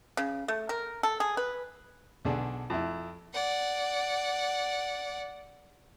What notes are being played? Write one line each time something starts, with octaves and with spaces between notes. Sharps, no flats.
C#3
A3
A#4
A4
G#4
B4
B1 D3 D4 G#4
F2 E4
D5 F#5